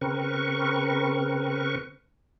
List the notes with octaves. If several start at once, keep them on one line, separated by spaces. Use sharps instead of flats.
C#3 C4 A#4 B4 C#6